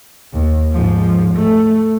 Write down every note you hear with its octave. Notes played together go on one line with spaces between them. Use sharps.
D#2
G#2 F3
A3